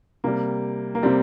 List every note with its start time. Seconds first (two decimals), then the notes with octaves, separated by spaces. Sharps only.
0.24 C3 G3 A#3
0.95 A#3
1.03 C3 G3 C4